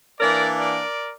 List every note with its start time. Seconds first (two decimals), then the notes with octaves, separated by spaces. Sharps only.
0.19 E3 A#3 D4 A#4 D5
0.58 A#4 D5